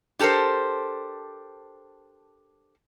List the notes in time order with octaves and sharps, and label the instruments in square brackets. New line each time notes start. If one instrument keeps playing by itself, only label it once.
[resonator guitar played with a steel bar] D4 G4 A4 A#4 C5